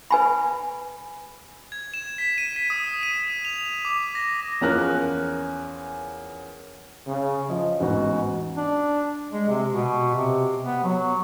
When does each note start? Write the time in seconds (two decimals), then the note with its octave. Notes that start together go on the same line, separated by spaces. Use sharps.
0.11 B4 G#5 B5
1.72 G#6
1.94 E7
2.18 B6
2.38 D#7
2.56 B6
2.70 D#6
3.03 D#7
3.45 F7
3.85 D6
4.15 A#6
4.61 E2 F3 C#4 A#4 F6 F#6
7.07 C#3
7.49 F3 D#5
7.80 A1 E2 G#2 F#4
8.57 D4
9.32 G#3
9.49 C3
9.71 B2
10.15 C3
10.66 B3
10.84 F#3